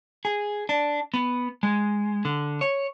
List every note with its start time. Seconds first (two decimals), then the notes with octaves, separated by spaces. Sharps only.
0.25 G#4
0.69 D4
1.14 B3
1.63 G#3
2.25 D3
2.61 C#5